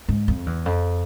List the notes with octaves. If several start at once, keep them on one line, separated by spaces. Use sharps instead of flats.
G#2
F2
E2
F2